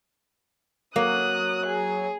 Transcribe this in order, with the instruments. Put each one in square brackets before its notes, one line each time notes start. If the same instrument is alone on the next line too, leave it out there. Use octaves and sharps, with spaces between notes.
[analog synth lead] F#3 [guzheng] A#3 [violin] D#6 F#6
[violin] G#4